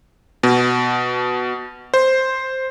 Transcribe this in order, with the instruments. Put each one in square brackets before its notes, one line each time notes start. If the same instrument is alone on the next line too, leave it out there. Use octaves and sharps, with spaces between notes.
[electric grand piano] B2
C5